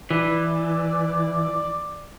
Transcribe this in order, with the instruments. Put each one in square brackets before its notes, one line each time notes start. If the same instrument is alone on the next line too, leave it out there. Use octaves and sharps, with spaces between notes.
[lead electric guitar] E3 [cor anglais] D5